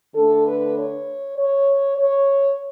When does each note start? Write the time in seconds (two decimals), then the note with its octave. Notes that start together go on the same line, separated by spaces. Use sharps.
0.15 D3 A3 D4 A4
0.46 B4
0.76 C#5
1.38 C#5
1.98 C#5